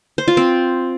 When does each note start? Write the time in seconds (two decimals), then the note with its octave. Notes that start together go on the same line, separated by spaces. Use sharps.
0.18 C5
0.28 F4
0.37 C4